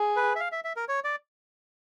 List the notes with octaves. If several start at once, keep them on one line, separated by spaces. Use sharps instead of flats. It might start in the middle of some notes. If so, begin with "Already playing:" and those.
Already playing: G#4
B4
E5
F5
E5
E5
A#4
C#5
D5